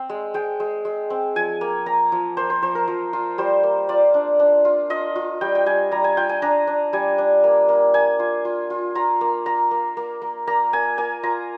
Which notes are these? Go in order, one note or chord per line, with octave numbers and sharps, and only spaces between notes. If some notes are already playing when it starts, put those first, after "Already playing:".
Already playing: C4
G#3
G#3 G5
G#3
G#3
C4
F3 G#5
A#3
A#3 A#5
F3
A#3 C5
C5
F3 C5
A#4
F3
F4
G3 C5
A#3
F4 D5
D4
D4
F4
F4 D#5
F4
G3 G5
G5
G3 G#5
G3 A#5
G#5
F4 G5
G#5
D4 A#5
D4
G3 G#5
D4
A#3
A#3
A#3 G#5
F4
F4
F4
F4 A#5
A#3
A#3 A#5
A#3
A#3
A#3
A#3 A#5
A#3 G#5
A#3 G#5
F4 A#5